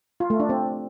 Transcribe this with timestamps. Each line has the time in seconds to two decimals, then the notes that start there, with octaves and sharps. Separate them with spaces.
0.20 F4
0.30 A3
0.40 D4
0.49 C4